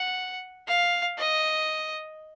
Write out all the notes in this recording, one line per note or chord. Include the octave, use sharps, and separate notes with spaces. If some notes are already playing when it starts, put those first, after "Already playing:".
Already playing: F#5
F5
D#5